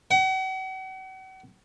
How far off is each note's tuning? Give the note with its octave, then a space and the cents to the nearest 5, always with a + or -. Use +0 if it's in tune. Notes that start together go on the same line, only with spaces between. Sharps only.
F#5 +40